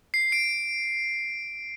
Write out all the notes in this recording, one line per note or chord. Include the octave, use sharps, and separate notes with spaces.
C7
D7